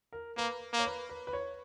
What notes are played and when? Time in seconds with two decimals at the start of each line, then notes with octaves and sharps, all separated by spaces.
0.13 A#4
0.37 A#3 B4
0.73 A#3
0.79 C#5
0.85 B4
1.09 B4
1.27 B4
1.33 C#5